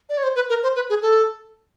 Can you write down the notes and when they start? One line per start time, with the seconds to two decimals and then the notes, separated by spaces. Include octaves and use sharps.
0.09 D5
0.18 C#5
0.23 C5
0.36 B4
0.49 A#4
0.63 C5
0.76 B4
0.90 G#4
1.02 A4